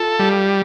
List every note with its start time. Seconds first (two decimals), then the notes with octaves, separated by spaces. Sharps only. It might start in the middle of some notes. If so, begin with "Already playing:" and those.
Already playing: F4 A4
0.19 G3